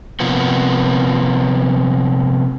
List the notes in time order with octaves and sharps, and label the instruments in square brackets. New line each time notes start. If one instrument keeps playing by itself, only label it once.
[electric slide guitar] C3 F3 A#3 B3